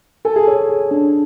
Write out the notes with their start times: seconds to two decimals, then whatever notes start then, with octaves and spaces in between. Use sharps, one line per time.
0.25 A4 G#5
0.36 G#4
0.47 A4 C#5
0.69 G#4
0.91 D4